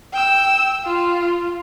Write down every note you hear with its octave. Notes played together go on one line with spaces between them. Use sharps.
G5 E6
F4